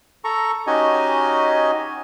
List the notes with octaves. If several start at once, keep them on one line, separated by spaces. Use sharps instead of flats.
A4 A#5 C#6
C#4 D#4 F#4 G4 D#5 G#5